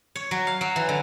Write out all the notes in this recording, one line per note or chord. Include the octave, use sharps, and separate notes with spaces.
C#5
F#3
F5
F#3
E3
D3